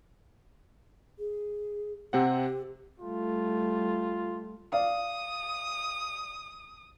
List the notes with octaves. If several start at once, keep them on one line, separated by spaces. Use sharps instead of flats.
G#4
C3 C4 G4 F#5
G3 A3 F4
D5 F5 D#6